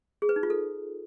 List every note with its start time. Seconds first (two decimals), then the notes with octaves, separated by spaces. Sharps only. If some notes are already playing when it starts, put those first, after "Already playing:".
0.22 G#4
0.29 B4
0.36 D#4
0.43 F4
0.50 A4